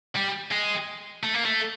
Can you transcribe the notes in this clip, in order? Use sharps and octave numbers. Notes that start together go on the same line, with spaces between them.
G3
G#3
A3
A#3
A3